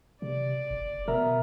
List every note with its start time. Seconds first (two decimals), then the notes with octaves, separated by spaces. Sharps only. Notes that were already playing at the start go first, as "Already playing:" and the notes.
0.22 C3 D5
0.71 F#1
1.08 B2 B3 A#4 E5 A#5